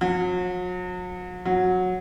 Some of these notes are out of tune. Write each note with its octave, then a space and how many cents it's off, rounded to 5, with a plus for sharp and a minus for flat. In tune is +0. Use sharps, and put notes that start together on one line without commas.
F#3 -40
F#3 -15